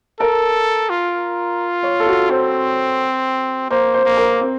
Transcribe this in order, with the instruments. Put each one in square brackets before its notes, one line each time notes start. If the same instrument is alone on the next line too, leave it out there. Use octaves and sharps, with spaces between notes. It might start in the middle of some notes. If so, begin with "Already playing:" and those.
[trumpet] A4 [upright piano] A#4
[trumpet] F4
[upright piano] C#5
A4
F#4
[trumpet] C4 [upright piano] C5
[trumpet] A#3 [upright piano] C5
[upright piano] C5
[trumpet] A#3
[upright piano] A#4
C4